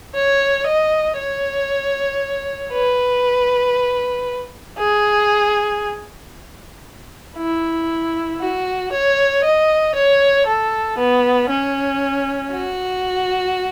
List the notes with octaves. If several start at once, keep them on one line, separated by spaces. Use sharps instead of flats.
C#5
D#5
C#5
B4
G#4
E4
F#4
C#5
D#5
C#5
A4
B3
C#4
F#4